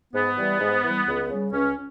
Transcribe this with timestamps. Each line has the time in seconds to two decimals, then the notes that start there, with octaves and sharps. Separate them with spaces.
0.13 G#2 B3
0.37 E3 G3
0.60 G#2
0.83 E3 G3
1.07 C#2
1.29 C#3 G3
1.52 C#2 C#4